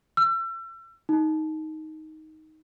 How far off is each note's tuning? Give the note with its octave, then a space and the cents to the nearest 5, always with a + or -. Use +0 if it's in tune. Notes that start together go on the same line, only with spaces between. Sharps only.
E6 +35
D#4 +10